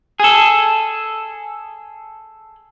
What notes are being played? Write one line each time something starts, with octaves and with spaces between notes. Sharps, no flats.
G#4 A4